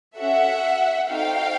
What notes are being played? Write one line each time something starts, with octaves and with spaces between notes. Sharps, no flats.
C#4 F#4 A4 E5 F#5
C4 D#4 F#4 A4 F5 G5